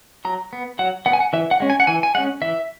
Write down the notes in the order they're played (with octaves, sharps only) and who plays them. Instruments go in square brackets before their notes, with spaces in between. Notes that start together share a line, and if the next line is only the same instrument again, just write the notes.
[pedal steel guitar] F#3 A#5
B3
F#3 F#5
B3 F#5
G#5
F#5
E3 E5
F#5
G#3 C#4
G#5
F#5
E3 G#5
G#5
G#3 C#4 F#5
E3 E5